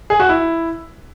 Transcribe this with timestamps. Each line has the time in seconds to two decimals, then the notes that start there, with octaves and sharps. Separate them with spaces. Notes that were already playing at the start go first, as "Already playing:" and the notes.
0.10 G#4
0.20 F#4
0.29 E4